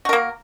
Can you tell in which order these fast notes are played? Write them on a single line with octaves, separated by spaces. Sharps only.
F#4 A#4 A#3